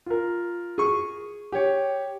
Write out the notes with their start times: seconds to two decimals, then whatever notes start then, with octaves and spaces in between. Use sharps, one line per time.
0.06 F4 A#4
0.78 G#4 C#6
1.52 G4 C#5